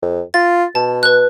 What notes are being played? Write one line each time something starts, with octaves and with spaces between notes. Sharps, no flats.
F2
F4 A6
B2 A5
B4 F#6